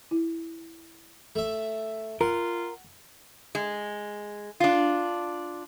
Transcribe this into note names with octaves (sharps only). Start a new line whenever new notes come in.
E4
A3 E5
F4 A#4 F#5
G#3
D4 F4